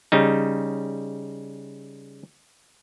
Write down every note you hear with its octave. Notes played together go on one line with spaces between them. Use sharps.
C#3 G3 D#4